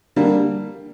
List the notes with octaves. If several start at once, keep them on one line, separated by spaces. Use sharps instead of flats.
D3 G3 A#3